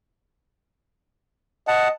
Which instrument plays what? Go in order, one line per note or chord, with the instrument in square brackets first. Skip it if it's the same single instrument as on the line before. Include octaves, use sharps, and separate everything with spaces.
[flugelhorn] D#5 [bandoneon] F#5 A5